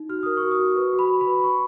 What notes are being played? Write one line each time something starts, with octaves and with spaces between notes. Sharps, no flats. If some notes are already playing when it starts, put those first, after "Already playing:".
Already playing: D#4
F#4 F6
A#4 D#6
C#6
F#4
D#6
F#4
B4 C#6
F#4
B5
F#4
B5
B4
B4 C#6